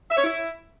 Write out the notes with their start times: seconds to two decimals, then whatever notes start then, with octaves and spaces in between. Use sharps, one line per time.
0.10 E5
0.17 C#5
0.24 E4